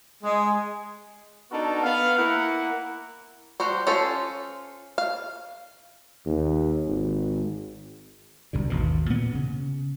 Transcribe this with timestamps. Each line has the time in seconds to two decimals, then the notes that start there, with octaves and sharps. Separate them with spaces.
0.23 G#3
1.51 B3 D4 D#4 F#4 A4 A#4
1.83 B3 F5
2.18 A#3 E4 F#5
3.60 F3 G3 F#4 C5
3.87 C#4 F4 A4 C5
4.98 F5
6.26 D#2
6.87 G#1
8.53 B1 G2 D3
8.70 G#1 D#2 B2
9.10 A#2 B3
9.35 C#3